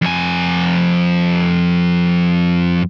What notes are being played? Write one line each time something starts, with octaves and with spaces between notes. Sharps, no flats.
F2 G#5